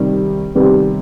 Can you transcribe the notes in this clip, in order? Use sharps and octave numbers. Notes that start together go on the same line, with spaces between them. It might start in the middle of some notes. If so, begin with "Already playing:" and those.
Already playing: C3 D#3 G3
C3 D#3 G3 B3